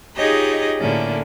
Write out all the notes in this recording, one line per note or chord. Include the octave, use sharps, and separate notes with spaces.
D#4 F4 G4 G#4 C#5 D#5
A2 D3 A#3 C#4 E4